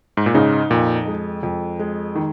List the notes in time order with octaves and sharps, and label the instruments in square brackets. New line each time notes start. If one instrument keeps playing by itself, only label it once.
[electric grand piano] G#2
A#2
[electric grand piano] G#2 C#3 [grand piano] D#4
[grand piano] F2 [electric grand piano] A#2
[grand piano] G#3
F2
G#3
D#3